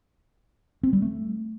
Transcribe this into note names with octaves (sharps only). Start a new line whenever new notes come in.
C4
G3
A3